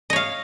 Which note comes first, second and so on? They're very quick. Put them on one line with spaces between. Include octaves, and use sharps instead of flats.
D#5 C#5 F5